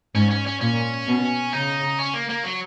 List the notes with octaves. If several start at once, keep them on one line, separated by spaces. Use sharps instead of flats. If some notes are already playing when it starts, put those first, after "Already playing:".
G#2 C#4
C#4
C#4
A#2 C#4
B2
C#3 D#4
C#4
A#3
A#3
F#3